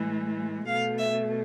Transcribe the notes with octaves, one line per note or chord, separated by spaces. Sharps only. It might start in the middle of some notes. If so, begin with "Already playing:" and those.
Already playing: A2 E3 G#3
B2 A3 F5
E5